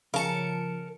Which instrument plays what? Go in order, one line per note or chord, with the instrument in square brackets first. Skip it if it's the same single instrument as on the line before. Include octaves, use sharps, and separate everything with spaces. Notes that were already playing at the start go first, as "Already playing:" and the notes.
[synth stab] C#3 C#7 [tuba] F3 [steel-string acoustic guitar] A#4 A5